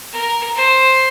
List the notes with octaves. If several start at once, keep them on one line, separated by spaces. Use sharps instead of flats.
A#4
C5